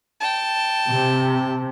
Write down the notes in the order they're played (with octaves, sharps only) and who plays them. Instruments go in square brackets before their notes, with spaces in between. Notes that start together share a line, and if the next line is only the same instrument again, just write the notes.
[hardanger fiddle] G5 A5
[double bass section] C3